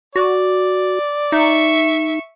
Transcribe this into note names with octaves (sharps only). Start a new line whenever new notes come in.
F#4 D5
D#4 E5 C#6